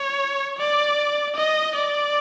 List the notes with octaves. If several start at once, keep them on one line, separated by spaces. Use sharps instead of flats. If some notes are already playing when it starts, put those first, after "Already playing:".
Already playing: C#5
D5
D#5
D5